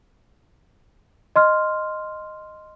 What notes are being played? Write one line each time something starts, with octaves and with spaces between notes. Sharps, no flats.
D#5 C6 F6